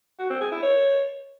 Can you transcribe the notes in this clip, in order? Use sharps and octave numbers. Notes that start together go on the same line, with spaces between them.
F#4
C4
G#4
E4
C#5